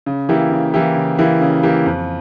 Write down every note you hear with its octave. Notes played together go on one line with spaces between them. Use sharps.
C#3
E3 A#3 E4 G4
C#3
E3 A#3 E4 G4
C#3
E3 A#3 E4 G4
C#3
E3 A#3 E4 G4
F2